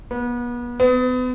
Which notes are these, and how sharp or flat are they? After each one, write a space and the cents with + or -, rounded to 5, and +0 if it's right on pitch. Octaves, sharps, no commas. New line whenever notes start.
B3 -35
B3 +35